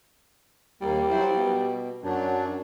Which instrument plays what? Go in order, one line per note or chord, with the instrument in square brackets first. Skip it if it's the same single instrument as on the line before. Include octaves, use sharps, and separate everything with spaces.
[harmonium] D#2 A#3 [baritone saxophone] G3
[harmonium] F#3 E4 C5
B2
[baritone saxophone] F#2 [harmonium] F#3 D4